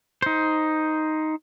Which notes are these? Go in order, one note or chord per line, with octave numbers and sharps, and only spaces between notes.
D#4 C5